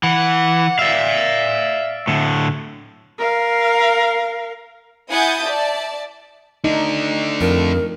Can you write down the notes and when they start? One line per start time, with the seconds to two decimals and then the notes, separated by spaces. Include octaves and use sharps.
0.03 E3 F#5
0.79 D5 E5 F5
2.07 A2 D3
3.18 A#4 F5
5.10 E4 F#5 G#5 D#6 G6 A6
5.44 D5 E5 A5
6.64 A3 D4 D#4
7.41 F2 A#4